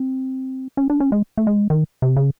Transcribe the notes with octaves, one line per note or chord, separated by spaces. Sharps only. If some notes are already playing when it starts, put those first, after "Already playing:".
Already playing: C4
C#4
D4
C#4
G#3
A3
G#3
D#3
C3
C#3